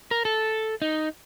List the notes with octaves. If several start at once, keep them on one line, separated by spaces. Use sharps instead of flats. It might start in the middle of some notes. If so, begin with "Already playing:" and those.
A#4
A4
D#4